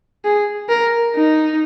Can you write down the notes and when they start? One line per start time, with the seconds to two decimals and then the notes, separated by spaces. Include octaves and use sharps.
0.25 G#4
0.69 A#4
1.16 D#4